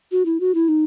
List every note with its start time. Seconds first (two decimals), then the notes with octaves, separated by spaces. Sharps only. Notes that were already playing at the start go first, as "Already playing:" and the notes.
0.12 F#4
0.26 E4
0.40 F#4
0.55 E4
0.68 D#4